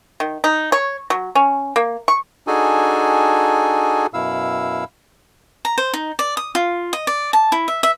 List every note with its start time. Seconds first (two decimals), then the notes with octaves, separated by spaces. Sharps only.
0.20 D#3
0.44 D#4
0.72 C#5
1.10 F#3
1.35 C#4
1.76 A#3
2.08 C#6
2.47 D4 D#4 F#4 G#4 A4 G#5
4.14 F#2 B2 E4 F5 E6
5.65 A#5
5.78 C5
5.93 D#4
6.19 D5
6.37 D#6
6.55 F4
6.93 D#5
7.07 D5
7.33 A5
7.52 E4
7.68 E5
7.83 E5